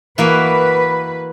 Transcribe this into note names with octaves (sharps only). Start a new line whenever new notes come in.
E3 A#3 F#4 B4